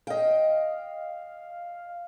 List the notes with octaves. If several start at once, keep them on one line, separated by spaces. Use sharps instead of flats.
D#5 F5 G5